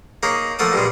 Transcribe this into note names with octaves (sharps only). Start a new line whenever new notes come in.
A#3 D#4 G#4 C#5
F3 A3 A#3 F#5 A5 D#6
G2 A#2 G#3